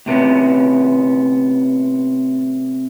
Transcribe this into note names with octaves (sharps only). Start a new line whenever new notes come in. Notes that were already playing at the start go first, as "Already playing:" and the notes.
A2 C3 B3 C#4